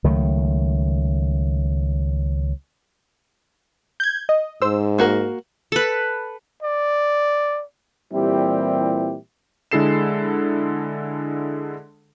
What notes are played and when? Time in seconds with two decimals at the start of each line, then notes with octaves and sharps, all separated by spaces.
0.04 C#2 D#3 F#3 A3
4.00 G6 G#6
4.29 D#5
4.62 G#2 C5 E6
4.98 A#3 F#4 A#4
5.72 A4 B4
6.63 D5
8.13 A#2 E3 G3 C4 E4 G4
9.72 D3 G#3 E4 A4 C7 E7